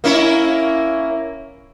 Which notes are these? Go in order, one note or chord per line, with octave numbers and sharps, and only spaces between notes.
A#3 C#4 E4